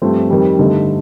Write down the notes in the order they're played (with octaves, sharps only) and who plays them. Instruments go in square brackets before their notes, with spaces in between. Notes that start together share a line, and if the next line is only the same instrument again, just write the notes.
[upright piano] G2 F3 A3 C4
F2 D#3 G3
G2 D3 A3 D#4